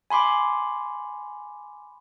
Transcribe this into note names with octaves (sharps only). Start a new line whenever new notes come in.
G#5 B5 C6 D6